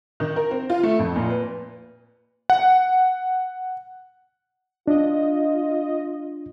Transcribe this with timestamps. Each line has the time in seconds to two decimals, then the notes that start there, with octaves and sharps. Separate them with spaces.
0.20 D#3
0.36 A#4
0.51 C4
0.70 F4
0.83 A3
0.99 F2
1.16 A#2
1.30 B4
2.50 F#5
4.87 D4 F4 D#5